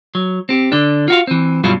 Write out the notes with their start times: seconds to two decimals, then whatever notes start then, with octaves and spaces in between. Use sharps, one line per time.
0.15 F#3
0.49 C4 G4
0.72 D3 D4
1.08 F4 F#4 F5
1.27 E3 C4
1.64 G2 B2 F#3 G3 E4 F4